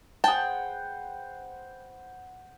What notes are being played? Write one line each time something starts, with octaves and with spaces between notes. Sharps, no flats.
G#4 B4 C5 F#5 G5 A5